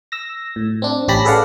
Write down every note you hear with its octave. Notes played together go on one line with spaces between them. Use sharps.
E6 A#6
A2
C4 D4
A1 C#4 G4 A5 B5 A#6
G#4 A4 B4 D5 F5 F#5